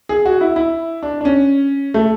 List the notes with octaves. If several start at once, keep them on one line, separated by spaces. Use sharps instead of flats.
G#4
F#4
E4
E4
D4
D4
C#4
A3